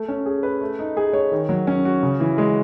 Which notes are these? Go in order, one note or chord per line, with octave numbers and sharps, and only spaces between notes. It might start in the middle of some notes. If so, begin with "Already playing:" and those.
Already playing: A3
C#4
G#4
B4
A3
D#4
G#4
C#5
D#3
F#3
C#4
F#4
C#3
E3
G#3